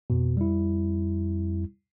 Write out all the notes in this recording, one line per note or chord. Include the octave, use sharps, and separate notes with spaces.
F2 B2
G3 E4